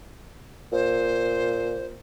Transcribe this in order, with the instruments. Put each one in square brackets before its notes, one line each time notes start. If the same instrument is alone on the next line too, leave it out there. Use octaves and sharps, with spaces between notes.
[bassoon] A#2 [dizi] C5